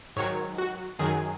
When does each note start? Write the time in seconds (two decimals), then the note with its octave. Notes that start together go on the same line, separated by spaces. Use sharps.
0.16 G#2 D#3 F#3 C#5
0.58 F#4
0.99 F#2 D#3 F#3 G#4